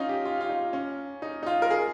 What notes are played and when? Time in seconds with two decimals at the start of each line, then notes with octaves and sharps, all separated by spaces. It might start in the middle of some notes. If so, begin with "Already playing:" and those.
Already playing: C#4 D#4 F4
0.09 G4
0.25 F4
0.41 F4
0.49 D#4
0.73 C#4
1.22 D#4
1.43 D#4
1.47 F4
1.62 A#4
1.71 G#4